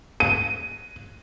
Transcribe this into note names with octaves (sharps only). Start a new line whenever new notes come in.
D#7